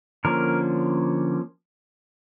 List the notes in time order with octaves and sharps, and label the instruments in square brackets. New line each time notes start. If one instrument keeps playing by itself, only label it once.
[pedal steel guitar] D3 F3 A#3 C#4 A#4